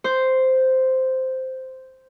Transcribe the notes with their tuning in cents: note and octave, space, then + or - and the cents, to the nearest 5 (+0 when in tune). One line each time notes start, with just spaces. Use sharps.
C5 -5